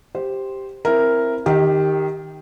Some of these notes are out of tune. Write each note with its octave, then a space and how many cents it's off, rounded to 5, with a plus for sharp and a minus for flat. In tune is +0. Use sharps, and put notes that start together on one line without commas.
G4 +0 C5 +0
C4 +0 E4 +10 A#4 +0
D#3 -10 G4 +5 D#5 +35